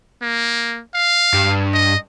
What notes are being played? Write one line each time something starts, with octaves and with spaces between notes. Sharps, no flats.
A#3
F5
G2
D#5